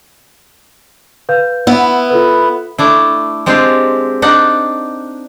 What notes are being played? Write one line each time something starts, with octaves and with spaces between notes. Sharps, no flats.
B4 F5 G6
B3 E4 E6
F4 A4 B4
A3 D4 E4
G#3 C4 D4 F4 G4
D4 D#4 F#5